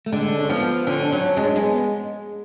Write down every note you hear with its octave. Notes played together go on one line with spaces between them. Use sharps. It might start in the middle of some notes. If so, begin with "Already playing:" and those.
A3
D3 G#3
D4
C#4
F3 B3
D3 C#4
D4
F#3 C#4
G#3 C#4
D4
G#3 C#4
B3